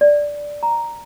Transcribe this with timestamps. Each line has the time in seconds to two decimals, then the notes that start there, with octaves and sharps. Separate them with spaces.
0.01 D5
0.63 A#5